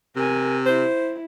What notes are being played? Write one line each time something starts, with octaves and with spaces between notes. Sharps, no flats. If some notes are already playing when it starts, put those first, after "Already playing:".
C3 A#4 G#5
E4 C5